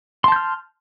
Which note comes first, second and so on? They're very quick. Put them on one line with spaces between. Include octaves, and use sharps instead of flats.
C6 A5 G6 F6